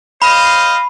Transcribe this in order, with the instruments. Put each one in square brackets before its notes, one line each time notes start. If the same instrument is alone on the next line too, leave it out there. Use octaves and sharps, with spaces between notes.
[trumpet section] C5 D#5 F5 [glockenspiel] B5